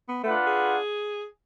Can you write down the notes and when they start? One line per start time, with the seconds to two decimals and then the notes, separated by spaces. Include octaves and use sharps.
0.08 B3
0.24 A3 D4 F4 B4 F#5
0.47 G#4